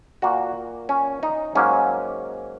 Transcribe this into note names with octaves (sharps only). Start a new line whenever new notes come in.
A#2 A#3 F#4
C#4
D#4
G#2 F#3 A#3 C#4